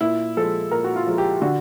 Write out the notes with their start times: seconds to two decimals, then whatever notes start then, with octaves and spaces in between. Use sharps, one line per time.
0.01 A#2 E4
0.37 F3 G#3 A4
0.71 A#2 A#4
0.84 F#4
0.96 F4
1.07 F3 G#3
1.18 G4
1.42 D3 F#4